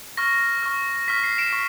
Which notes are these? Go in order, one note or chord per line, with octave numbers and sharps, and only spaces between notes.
C#6 F6 A#6
C#6 F6
C#6 F6 B6
C7
D7 E7
C#6